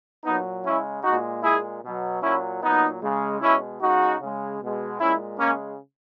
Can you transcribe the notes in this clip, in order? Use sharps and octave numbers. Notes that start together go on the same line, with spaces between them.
A#2 F#3 B3 D#4
C#3 G#3 C#4 E4
A#2 G#3 D#4 F#4
A#2 G#3 E4 G#4
B2 F#3
A#2 F#3 C#4 E4
A#2 F#3 B3 D#4
C#3 G#3
B2 G#3 C#4 E4
C#3 G#3 D#4 F#4
C#3 G#3
B2 G#3
A#2 G#3 C#4 E4
C#3 G#3 A#3 C#4